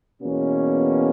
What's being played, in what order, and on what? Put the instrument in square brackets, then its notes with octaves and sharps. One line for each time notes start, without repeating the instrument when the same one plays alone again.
[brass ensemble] E2 B2 A#3 C#4